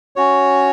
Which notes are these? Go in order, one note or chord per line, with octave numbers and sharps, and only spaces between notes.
C#4 F#4 C#5